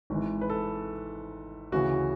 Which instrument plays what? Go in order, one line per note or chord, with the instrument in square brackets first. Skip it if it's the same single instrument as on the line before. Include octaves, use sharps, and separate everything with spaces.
[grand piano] G#1 G#2 E3
B4
A4
D2 C#3 E3 F#4